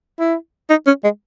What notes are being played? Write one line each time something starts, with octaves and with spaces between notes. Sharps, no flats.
E4
D#4
C#4
G#3